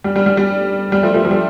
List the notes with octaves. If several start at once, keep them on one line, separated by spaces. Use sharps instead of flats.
G3
G3
G3
G3
G3
F3 A3
F3 A3
F3
G3